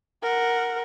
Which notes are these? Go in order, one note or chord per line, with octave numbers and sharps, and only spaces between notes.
A#4 F#5